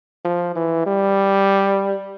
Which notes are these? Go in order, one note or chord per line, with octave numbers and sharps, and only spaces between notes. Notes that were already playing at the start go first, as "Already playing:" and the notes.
F3
E3
G3